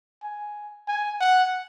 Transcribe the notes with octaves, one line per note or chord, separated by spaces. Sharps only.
G#5
G#5
F#5